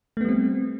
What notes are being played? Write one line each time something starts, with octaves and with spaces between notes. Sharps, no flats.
G3 A3 B3 C4